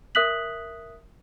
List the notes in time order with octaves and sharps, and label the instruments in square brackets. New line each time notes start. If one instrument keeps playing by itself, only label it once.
[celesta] A#4 E5 D#6 F#6 B6 F#7